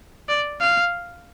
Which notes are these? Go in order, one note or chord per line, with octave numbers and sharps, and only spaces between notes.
D5
F5